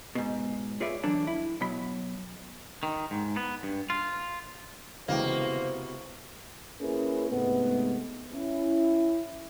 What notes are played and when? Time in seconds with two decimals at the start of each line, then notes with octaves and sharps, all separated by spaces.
0.15 G#2 B2
0.80 F4 G#4 B4 C#5 D5 E5
1.03 D3 E3 F#3 D4 A4
1.27 E4
1.61 B2 F#3 B5
2.83 D#3
3.11 G#2
3.37 B3
3.63 G2
3.90 F4
5.08 C#2 C3 E3 A#3 B3 F#4 C5 G5
6.81 A#3 C#4 E4 G#4 A#4 B4
7.30 G#2 C3 G#3 A3 B3
8.33 C#4 E4